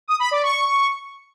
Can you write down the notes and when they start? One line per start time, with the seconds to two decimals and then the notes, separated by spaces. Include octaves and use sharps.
0.08 D#6
0.19 B5
0.31 D5
0.43 C#6